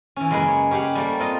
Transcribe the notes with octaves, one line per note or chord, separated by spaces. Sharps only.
E3 C#4
F#2 C#3 G#3 A#3 B4
C#5
C#4 G4 F5 F#5
G3 A3 A#3 C5
C4 F4 D#5